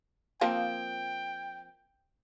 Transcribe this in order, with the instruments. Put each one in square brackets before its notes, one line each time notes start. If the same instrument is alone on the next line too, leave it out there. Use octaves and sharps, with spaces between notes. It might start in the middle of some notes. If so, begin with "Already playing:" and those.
[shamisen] F3 A#3 C4 [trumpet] G5